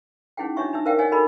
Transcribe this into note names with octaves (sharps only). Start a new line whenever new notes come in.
C#4 D#4 E4 G#4 F#5 G5
D4 F#4 C#5 D#5 E5 C#6
D4 D#4 E5 E6
A#4 C5 D5 E5 F5 G5
C#5 D#5 E5 F#5 G#5
D#4 F#4 A4 A#4 D#5 B5